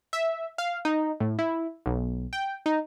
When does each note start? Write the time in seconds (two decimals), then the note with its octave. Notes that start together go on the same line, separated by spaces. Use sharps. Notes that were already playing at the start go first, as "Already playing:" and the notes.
0.13 E5
0.58 F5
0.85 D#4
1.20 A2
1.39 E4
1.86 B1
2.33 G5
2.66 D#4